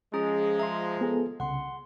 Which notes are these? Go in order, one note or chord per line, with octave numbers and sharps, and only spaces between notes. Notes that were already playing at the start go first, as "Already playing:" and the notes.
F3 G#3 C#4 G#4 A#5
E5 A#5 C6
B3 G#4 A4
C2 C#3 F#5 C6